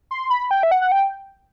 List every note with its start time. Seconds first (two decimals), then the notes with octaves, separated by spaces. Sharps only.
0.11 C6
0.30 B5
0.51 G5
0.63 E5
0.71 F#5
0.81 F#5
0.92 G5